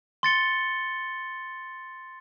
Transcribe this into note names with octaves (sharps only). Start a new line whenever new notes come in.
C6 A6 C#7 G7